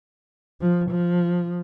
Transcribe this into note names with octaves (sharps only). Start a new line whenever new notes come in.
F3
F3